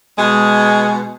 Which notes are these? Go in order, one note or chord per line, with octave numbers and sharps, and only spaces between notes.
B2 G#3